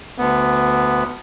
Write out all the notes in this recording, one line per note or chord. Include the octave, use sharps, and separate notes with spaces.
D2 B3